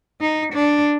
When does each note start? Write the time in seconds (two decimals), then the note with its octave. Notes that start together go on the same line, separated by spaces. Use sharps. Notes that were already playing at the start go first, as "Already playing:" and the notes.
0.21 D#4
0.54 D4